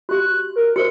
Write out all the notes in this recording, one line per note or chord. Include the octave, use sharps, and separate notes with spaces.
F#4 G4 F#6
A#4
F#4 A#4 C5 C#7